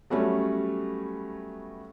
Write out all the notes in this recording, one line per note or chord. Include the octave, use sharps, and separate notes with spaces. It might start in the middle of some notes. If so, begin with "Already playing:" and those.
F#3 G3 A3 B3 C#4